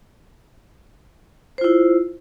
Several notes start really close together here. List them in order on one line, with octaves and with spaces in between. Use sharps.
C5 F4 E4